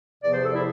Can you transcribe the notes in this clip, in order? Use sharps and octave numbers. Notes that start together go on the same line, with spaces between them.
E2 C3 F3 B3 D5
C5
A4
E4